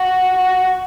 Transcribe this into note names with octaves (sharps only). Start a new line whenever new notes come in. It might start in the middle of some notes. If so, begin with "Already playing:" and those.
Already playing: F#4
F#4